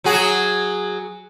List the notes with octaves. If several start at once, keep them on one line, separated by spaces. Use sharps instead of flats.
F#3 F#4 G#4